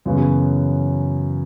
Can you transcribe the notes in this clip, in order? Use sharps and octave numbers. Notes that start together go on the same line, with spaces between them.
F#2 C#3 E3 B3 F#4